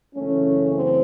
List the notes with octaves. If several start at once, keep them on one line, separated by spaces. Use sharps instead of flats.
F#2 C#3 E3 A3 C#4
C4